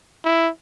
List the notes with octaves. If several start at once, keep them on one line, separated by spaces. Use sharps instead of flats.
E4